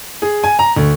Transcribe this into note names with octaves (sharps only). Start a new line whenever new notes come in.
G#4
G#5
A#5
D2